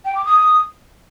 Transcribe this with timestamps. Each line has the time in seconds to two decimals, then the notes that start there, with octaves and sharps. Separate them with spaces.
0.05 G5
0.15 D6
0.25 D#6